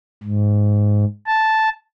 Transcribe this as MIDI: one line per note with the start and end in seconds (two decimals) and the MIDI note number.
0.24 1.05 44
1.27 1.69 81